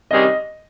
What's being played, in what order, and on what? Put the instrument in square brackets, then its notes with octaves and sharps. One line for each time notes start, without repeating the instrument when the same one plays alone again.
[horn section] C3 D#3 G3 C#4 G#4 [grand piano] D#5